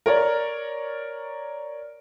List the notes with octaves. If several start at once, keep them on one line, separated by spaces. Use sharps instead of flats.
A#4 C#5 D5